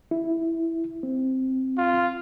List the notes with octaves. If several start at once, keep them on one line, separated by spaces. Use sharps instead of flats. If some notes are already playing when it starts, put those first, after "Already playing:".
E4
C4
F4